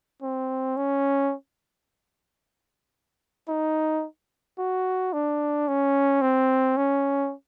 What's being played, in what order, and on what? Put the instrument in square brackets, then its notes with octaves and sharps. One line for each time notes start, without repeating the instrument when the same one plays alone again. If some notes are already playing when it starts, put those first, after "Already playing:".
[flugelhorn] C4
C#4
D#4
F#4
D4
C#4
C4
C#4